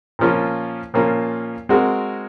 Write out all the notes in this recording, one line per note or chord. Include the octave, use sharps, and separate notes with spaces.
A#2 F3 A#3 C#4 F4
A#2 F3 A#3 C#4 F4
G#3 C4 F#4 A#4